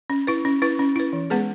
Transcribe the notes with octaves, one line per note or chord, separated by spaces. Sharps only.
C#4
E4 B4
C#4
E4 B4
C#4
E4 B4
E3
G#3 B3 G#4 B4